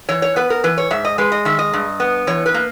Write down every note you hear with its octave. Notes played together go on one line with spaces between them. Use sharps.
E3 C#5
C#5
B3 B4
A#4
E3 B4
C#5
G#2 E5
D#5
G#3 B4
D#5
D#3 E5
D#5
G2
B3
E3 C#5
B4
A#3